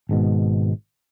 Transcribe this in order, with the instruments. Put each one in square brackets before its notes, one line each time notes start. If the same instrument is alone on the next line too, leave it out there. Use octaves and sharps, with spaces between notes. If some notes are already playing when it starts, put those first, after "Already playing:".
[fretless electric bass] G#1 G#2 B2